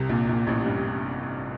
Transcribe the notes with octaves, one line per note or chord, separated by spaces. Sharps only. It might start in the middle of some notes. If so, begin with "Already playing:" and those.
Already playing: C2 C3
A#1 A#2
A#1 A#2
A1 A2
G2